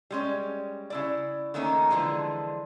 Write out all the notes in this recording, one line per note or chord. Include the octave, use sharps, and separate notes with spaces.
G3 G#3 C#4
C#3 E4 D5
D#3 A3 A#3 C#4 D#4
D3 E3 F3 G#3 D4